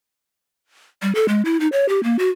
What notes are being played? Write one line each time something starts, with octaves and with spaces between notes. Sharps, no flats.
G3
A4
G#3
E4
D#4
C#5
G4
A#3
F#4